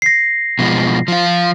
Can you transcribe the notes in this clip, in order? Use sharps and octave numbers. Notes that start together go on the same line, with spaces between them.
A#6 C7
B2 F3 G#3
F3 F4